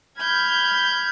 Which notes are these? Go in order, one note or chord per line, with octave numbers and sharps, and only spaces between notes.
B5 F6 G6 G#6